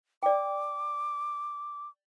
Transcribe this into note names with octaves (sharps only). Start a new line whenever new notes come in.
D5 G5 D6